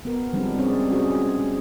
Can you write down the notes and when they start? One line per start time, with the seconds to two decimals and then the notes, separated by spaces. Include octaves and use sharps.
0.05 B3 A#4
0.33 F3 G3 G#3 C4 D4
0.58 G#3 C4 C#4 G#4 C#5 D5
0.90 C#4 F#4 G#4 C5
1.40 G#4